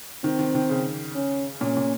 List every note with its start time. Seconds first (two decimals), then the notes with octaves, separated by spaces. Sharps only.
0.24 D#3 C4
0.39 D#3
0.55 D#3
0.69 C#3
1.15 C#4
1.61 A#2 C#4
1.77 A#2